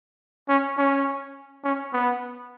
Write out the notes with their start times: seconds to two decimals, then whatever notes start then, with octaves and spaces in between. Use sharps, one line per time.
0.49 C#4
0.78 C#4
1.64 C#4
1.93 B3